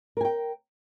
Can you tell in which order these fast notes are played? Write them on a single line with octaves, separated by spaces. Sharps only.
A#4 G#5 G5